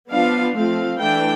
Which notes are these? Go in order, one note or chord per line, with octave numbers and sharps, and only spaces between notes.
F3 B3 D4 F5
F3 A3 C4 F5
E3 A3 D4 G5